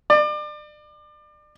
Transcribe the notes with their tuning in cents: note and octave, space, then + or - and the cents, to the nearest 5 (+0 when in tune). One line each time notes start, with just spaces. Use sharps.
D5 +35